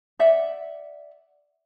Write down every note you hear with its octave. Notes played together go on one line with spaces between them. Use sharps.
D5 E5 F#5